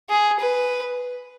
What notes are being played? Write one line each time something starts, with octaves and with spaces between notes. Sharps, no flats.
G#4
B4